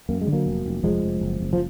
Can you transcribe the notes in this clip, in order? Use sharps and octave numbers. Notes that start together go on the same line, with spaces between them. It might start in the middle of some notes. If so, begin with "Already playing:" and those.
F#2 A#3
G#3
D3
F#3 A#3
F1
F1
F1 F3 G#3
F1
F#1
F#1
F3